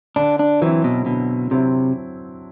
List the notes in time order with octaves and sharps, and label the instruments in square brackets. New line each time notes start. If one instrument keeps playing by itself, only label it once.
[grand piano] D3 [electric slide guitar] D4
[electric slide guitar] D4
[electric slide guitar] E3 [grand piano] F#3 C4 E4
[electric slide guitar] B2
[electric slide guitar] B2 [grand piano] D3
[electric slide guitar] C3 [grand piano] F#3 C4 E4